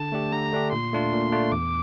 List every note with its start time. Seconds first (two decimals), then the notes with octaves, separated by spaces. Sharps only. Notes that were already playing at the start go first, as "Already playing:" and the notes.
Already playing: D3 A5
0.12 A3 D4 G4
0.32 D3 A#5
0.53 A3 D4 G4
0.72 A#2 C6
0.93 A3 D4 F4
1.13 A#2
1.32 A3 D4 F4
1.52 E2 D6